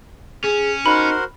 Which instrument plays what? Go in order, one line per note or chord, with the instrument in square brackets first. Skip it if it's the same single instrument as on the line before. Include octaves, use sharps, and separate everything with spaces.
[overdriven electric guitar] C#4 [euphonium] G#4
[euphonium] D#4 [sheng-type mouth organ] F#4 A#4 C5 [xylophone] B5